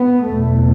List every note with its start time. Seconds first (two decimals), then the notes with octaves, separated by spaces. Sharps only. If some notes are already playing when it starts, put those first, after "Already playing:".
Already playing: B3
0.25 F#1 E2 B2 A3